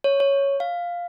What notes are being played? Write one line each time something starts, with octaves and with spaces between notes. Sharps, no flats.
C#5
C#5
F5